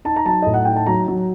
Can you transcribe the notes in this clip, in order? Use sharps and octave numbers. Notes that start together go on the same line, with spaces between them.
D#4 A5
A#5
F#3 A5
A2 D#5
F#5
D#4 G5
A5
F#3 A#5
F#3